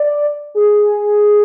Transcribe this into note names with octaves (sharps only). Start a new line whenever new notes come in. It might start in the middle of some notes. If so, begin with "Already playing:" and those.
Already playing: D5
G#4